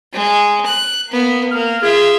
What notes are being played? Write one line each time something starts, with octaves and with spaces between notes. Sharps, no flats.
G#3
F#6
A#3 B3
A#3 F6
F4 G#4 E5